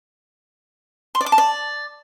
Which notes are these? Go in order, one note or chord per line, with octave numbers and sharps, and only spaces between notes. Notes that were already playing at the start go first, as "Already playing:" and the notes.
C6
D5
D6
A5
D5